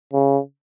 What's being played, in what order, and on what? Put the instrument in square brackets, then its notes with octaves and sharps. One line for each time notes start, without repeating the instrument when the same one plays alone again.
[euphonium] C#3